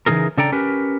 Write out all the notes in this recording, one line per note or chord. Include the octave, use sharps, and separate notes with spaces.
C#3 E3 F3 D#4 G#4 A#4
C#3 D4 A4 D5 G5 A#5
C#4 G4 A#4 B4